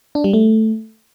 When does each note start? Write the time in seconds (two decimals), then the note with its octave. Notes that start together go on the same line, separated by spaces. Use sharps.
0.15 D4
0.24 G3
0.33 A3